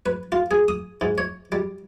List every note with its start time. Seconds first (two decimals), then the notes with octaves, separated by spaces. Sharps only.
0.06 B4
0.32 F4
0.51 G#4
0.68 D#6
1.01 G#2
1.18 C#5
1.52 G3